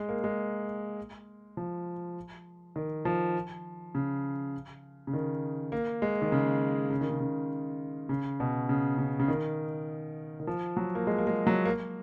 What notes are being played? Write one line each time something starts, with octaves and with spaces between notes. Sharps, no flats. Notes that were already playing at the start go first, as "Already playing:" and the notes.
Already playing: G#3
A#3
G#3
F3
D#3
F3
C#3
C#3
D#3
A#3
G#3
D#3
C#3
C#3
D#3
C#3
C#3
C#3
B2
C#3
C#3
C#3
D#3
D#3
F3
F#3
A#3
G#3
A#3
G#3
F#3
A#3